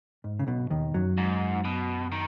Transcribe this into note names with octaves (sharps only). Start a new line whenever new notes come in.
G#2
C#3
B1 B2
D#2 D#3
F#2 F#3
G#2
B2
D#3